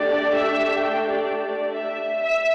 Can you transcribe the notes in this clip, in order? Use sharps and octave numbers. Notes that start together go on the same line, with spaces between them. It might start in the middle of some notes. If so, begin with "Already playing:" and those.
Already playing: A3 D4 G4 D5
E5
G5
D5
D5
E5
E5